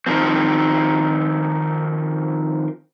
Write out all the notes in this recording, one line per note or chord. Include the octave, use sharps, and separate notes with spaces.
D#3 F3 C4